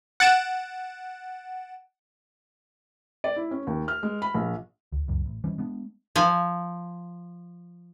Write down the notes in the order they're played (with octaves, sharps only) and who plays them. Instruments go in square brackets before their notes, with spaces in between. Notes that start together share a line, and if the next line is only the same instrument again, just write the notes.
[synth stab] F#5 A6 D7 E7
[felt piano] D5
E4
C#4
D#2
F6
G#3
B5
A#1
[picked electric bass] D2
C#2 F#2
A1
E3 G3 C#4
G#3 B3 D4
[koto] F3 G#5